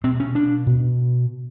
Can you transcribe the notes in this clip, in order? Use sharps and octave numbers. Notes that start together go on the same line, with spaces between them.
B2 C4
C#4
D4
B2